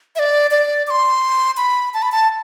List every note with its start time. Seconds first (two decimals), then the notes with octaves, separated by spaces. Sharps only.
0.16 E5
0.19 D5
0.51 D5
0.87 D6
0.90 C6
1.57 B5
1.94 A5
2.02 B5
2.12 A5